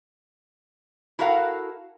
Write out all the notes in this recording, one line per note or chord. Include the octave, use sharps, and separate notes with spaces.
E4 F#4 A4 A#4 F5 F#5